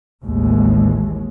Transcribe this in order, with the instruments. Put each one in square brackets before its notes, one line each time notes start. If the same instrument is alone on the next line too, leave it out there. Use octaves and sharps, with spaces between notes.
[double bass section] A1 D#2 A2 G#3